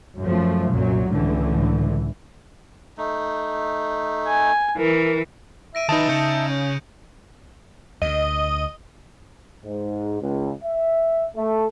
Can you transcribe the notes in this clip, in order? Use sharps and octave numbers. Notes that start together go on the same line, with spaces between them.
F#2 F3 A3
C2 F#2 A#2 F#3
C#2 A2 D3 E3
A3 D#4
G#5
E3 A#4
E5 A#6 D7 D#7
D#3 D#4 B4 E5 A5 D#6 A#6 F7
C#3 G6 C#7 D#7
G6
C#4
D2 D#5
G#2
C#2
E5
A3